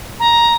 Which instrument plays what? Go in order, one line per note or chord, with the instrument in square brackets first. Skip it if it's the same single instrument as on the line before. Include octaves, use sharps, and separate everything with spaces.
[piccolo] A#5